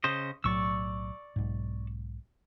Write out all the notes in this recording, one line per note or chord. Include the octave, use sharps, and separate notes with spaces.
C#3 C5 D#5
B1 A2 F#3 D5 C#6 E6
B1 G#2